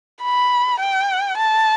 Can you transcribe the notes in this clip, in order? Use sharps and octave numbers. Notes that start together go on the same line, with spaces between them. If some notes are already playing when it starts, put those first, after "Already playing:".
B5
G5
A5